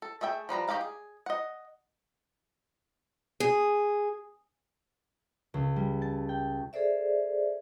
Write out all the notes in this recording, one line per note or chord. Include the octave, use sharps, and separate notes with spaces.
A4
A3 G#4 E5 G5
F3 G3 B4 A#5
D#3 G4 G#4 F5 A#5
G#4
D#5 F#5
G#4
C#2
G3
A5
G5
G#4 A4 C5 D5 E5